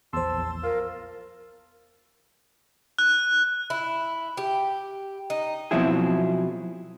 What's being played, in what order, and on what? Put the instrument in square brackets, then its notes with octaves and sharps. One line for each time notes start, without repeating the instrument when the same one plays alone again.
[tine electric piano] A#1 E2 [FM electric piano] C5 C6 [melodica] A5 E6
[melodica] F4 F5 [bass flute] A#4
[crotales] F#6
[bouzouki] E4
G4
D#4
[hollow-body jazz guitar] B2 F3 F#3 C4 E4 G#4